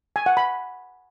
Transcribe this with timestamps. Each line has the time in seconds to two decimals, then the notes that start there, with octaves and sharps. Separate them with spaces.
0.16 G#5
0.26 F#5
0.37 B5